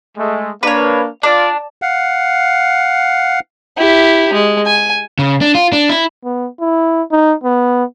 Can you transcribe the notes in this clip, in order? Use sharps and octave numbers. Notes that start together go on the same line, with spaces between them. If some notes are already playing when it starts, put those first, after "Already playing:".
G#3 A3
A#3 D4 B4 C#5
D4 F4 D5
F5 F#5
E4 G4
G#3
G#5
C#3
D4
F4
D4
E4
B3
E4
D#4
B3